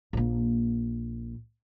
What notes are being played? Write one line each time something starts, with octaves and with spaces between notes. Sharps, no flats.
A#1 A#3